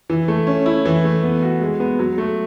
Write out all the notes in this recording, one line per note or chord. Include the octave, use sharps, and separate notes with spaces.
E3
A3
C#4
E4
E3
A3
B3
F#4
G#3
B3
F#3
A3